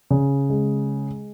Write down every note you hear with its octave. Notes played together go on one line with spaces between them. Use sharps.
C#3
G#3